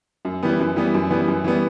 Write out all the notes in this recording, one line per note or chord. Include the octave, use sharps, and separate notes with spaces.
F#2
E3 G3 B3
F#2
E3 G3 B3
F#2
E3 G3 B3
F#2
E3 G3 B3